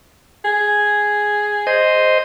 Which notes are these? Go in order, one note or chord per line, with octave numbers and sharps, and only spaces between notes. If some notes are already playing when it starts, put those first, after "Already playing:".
G#4
C5 D#5